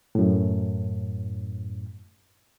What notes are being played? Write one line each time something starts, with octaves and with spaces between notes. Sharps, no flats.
F#2 A2